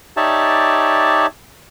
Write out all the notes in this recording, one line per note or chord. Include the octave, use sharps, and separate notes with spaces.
D#4 G4 C#5 D5 E5 A5